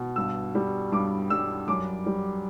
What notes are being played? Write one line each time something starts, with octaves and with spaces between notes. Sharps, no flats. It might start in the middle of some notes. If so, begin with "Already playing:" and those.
Already playing: B2
G2 E6
G3
G2 D6
G3 E6
F#2 D6
G3